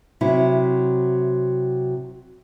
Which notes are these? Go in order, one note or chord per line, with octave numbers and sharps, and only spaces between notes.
C3 F#3 E4